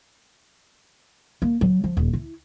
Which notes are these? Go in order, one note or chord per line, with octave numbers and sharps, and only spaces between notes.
A#3
F#3
F3
D#1
E4